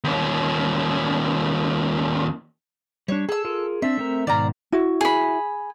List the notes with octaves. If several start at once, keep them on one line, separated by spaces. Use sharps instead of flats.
D#2 C#4
G3 D4 C#5
G#4 A4 E6
F4 G#4 A#4
C4 D4 E5
A3 C4 A#4
G#2 B2 D#3 D5 F5 A#5
E4 F#4
G#4 B5